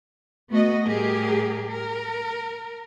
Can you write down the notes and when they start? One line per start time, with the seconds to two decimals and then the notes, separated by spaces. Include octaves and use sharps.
0.51 A3 B3 F#4 D#5
0.85 A2 G3 G4 G#4 A#4
1.70 A#4